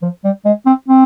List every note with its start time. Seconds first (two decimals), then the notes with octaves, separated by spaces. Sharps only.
0.02 F3
0.24 G3
0.45 G#3
0.66 C4
0.88 C4